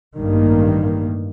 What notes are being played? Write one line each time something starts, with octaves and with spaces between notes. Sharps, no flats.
A1 G2 D#3 A#3